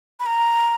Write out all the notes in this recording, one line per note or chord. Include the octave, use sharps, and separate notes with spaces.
B5
A#5